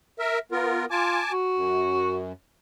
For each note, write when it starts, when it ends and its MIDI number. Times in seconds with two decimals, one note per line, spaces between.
0.19 0.39 70
0.19 0.39 76
0.52 0.85 59
0.52 0.85 65
0.52 0.85 70
0.91 1.19 65
0.91 1.32 80
0.91 1.32 81
0.91 1.32 86
1.32 2.20 66
1.56 2.32 42